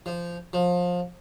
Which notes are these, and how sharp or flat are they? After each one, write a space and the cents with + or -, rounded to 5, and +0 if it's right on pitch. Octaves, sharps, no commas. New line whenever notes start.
F3 -15
F3 +25